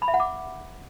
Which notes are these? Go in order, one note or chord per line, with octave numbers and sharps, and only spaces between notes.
B5
E5
F#5
D6